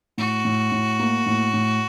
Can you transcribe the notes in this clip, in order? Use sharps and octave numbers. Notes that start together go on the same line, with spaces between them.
A2 F#4
A2
A2
A#3
A2
A2